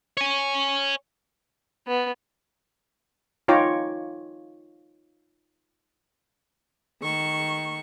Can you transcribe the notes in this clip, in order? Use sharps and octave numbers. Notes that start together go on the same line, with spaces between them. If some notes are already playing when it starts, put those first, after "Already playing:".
C#5 G#5
B3
D#4 F4 C#5 G5 A#5 D6
D#3 C#6